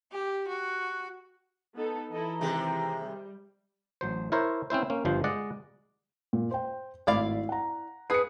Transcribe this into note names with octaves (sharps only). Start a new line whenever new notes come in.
G4
F#4
B3 D#4 A4
E3 E4 A4 D#5 A#5
C3 D#3 G#3 C4 G4
G3
A1 F#3 C5
E4 A#4 C5 C#5
C4 C#4 E4 C5
A#3 C#4
G1 G2 F3 C5
G#3 D5 D#5 F#5
A#2
C5 G5
G#1 A2 E4 D5 F5
F#5 A#5
G#4 B4 C7 C#7